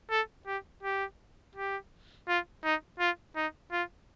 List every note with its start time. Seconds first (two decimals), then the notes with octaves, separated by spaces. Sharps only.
0.10 A4
0.46 G4
0.83 G4
1.55 G4
2.28 F4
2.64 D#4
2.99 F4
3.36 D#4
3.72 F4